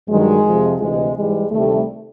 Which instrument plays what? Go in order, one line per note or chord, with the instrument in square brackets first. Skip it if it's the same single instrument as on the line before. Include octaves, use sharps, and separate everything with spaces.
[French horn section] G2 D#3 F#3 G#3
F2 C3 F3
D2 C3 E3 G#3
G#2 E3 G3 G#3
D2 C3 D#3 G3 A3